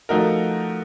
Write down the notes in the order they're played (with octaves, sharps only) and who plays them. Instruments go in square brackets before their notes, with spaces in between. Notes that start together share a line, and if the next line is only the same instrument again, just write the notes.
[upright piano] F3 A3 D#4 F#4 A#4